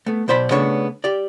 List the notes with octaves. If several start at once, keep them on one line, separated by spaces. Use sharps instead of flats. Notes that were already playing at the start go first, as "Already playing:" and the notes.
A3 B3
B1 B2 C5 D5 B5
C#3 A3 B3 D4 C#5
G4 D5